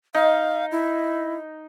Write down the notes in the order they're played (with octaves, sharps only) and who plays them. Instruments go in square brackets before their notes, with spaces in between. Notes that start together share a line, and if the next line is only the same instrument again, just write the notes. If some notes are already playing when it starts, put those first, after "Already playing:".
[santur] D#4 [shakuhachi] F5
[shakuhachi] E4